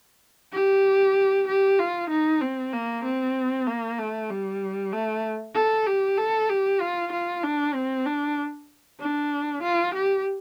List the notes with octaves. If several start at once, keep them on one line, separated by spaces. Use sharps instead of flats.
G4
G4
F4
D#4
C4
A#3
C4
A#3
A3
G3
A3
A4
G4
A4
G4
F4
F4
D4
C4
D4
D4
F4
G4